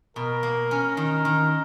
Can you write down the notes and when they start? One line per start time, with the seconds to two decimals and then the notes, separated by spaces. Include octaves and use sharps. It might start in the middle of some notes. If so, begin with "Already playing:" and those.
0.16 B2 A#4
0.43 A#3
0.71 C#4
0.97 D#3
1.25 D#3